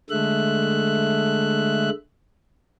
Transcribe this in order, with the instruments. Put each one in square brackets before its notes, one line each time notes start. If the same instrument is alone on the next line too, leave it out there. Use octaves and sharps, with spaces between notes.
[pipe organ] D3 G#3 A3 E5 F#6